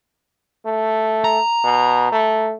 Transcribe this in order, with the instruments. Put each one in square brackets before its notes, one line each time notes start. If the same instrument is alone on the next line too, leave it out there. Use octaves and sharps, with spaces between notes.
[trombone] A3
[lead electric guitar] A#5
[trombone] B2
A3